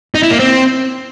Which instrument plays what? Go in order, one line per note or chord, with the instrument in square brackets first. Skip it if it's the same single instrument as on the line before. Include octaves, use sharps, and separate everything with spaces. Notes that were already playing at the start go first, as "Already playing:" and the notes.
[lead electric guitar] D#4
E4
A#3
C4